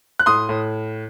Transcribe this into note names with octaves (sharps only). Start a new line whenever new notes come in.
F#6
A2 C6 D#6
A2